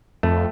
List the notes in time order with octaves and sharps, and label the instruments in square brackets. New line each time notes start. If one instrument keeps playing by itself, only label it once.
[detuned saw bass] F2 [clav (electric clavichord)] A3